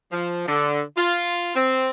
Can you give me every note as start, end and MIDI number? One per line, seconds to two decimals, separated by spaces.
0.12 0.47 53
0.47 0.81 50
0.97 1.51 65
1.55 1.90 60